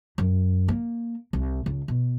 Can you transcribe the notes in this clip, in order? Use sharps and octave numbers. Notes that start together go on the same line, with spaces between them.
F#2
A#3
C2
C#2
B2